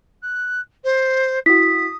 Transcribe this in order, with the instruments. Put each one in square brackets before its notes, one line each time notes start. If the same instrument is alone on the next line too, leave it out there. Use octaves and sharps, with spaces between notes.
[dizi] F#6
C5
[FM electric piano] E4 F#4 [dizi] D#6 [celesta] B6